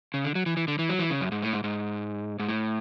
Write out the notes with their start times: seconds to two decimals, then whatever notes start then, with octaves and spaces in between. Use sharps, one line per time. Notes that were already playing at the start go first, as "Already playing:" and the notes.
0.14 C#3
0.25 D3
0.35 F#3
0.46 E3
0.57 E3
0.68 D3
0.79 E3
0.89 F#3
0.99 E3
1.11 C#3
1.21 F#2
1.32 G#2
1.42 A2
1.53 G#2
1.64 G#2
2.39 G#2
2.49 A2